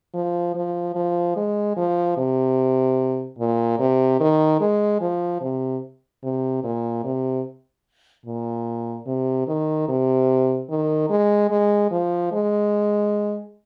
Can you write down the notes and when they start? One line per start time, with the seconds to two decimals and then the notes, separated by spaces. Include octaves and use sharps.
0.14 F3
0.55 F3
0.96 F3
1.36 G#3
1.77 F3
2.18 C3
3.39 A#2
3.79 C3
4.20 D#3
4.61 G#3
5.01 F3
5.42 C3
6.23 C3
6.64 A#2
7.04 C3
8.26 A#2
9.07 C3
9.48 D#3
9.89 C3
10.70 D#3
11.10 G#3
11.51 G#3
11.91 F3
12.32 G#3